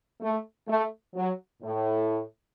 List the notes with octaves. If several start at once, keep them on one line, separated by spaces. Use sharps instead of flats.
A3
A3
F#3
A2